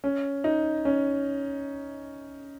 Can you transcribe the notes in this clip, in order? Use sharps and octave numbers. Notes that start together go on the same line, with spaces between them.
C#4
D#4
C#4